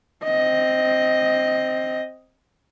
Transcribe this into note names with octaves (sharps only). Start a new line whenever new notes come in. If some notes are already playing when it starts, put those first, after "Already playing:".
C4 D#5